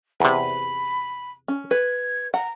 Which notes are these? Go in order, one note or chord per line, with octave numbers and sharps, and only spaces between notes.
E2 C3 B5
C#4
B4 G#6
F#5 A#5